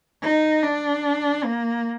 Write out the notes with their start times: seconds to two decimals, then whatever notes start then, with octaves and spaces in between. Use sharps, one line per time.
0.23 D#4
0.64 D4
1.44 A#3